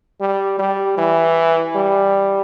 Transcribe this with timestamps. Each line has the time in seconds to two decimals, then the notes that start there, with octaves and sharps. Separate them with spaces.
0.20 G3
0.59 G3
0.98 E3
1.75 G3